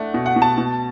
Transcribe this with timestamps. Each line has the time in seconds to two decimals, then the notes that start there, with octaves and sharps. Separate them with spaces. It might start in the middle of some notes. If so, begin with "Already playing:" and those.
Already playing: A3 D4 F#5
0.14 B2
0.26 F#5
0.36 B2
0.42 A5
0.58 B2